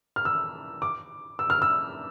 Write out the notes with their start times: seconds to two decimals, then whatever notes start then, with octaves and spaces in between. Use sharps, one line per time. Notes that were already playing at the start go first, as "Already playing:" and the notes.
0.16 F6
0.25 E6
0.82 D6
1.39 E6
1.50 F6
1.62 E6